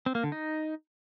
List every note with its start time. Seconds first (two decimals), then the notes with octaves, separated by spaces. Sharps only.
0.06 C4
0.15 A#3
0.23 D3
0.32 D#4